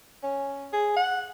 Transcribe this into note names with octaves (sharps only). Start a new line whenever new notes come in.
C#4
G#4
F#5